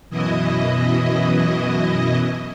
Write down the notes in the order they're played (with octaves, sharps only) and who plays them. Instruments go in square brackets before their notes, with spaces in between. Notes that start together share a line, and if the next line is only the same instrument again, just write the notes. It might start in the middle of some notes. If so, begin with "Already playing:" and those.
[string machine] F#2 B2 E3 E4 D#5